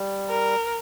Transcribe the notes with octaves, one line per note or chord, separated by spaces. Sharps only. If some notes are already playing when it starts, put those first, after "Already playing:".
Already playing: G3
A#4